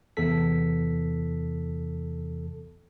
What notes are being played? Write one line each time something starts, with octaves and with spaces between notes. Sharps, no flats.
E2 C3 A4 B6